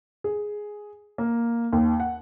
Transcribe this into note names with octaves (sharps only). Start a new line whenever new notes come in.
G#4
A#3
D#2
F#5